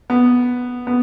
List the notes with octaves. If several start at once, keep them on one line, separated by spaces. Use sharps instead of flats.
B3
B3